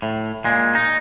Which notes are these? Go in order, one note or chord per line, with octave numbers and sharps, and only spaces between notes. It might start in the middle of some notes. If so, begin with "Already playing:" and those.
A2
A#2 G#3
D#4